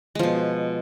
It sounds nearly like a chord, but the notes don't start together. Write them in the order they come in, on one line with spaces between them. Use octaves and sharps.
G#3 F3 B2